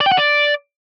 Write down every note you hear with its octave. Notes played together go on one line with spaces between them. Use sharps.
D5
G5
F#5
D5